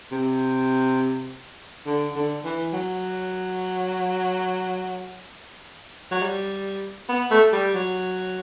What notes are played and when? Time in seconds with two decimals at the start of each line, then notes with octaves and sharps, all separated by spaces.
0.12 C3
1.86 D3
2.15 D3
2.44 E3
2.73 F#3
6.11 F#3
6.22 G3
7.09 B3
7.31 A3
7.52 G3
7.75 F#3